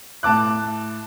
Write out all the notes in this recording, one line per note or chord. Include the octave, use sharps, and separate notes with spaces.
A2 A5 D6 F#6